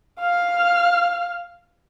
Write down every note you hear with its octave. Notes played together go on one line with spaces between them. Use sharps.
F5 F6